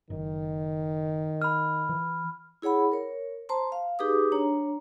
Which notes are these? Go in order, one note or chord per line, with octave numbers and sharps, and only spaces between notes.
F#1 D#3
B5 F6
E3
E4 G#4 C#5 F#5 B5
A#4 C#5
C5 A5 A#5 C6
F5
D#4 G4 G#4 B4 D6 D#6
D4 C#5 A#5